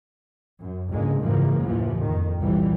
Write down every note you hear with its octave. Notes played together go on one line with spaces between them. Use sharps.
F#2
C#2 G#2 D3 G#3 A#3
F#1 G#2 C#3 E3 F3 A#3
D#2 A2 E3 F3
F2 D#3
C2 A#2 E3 G3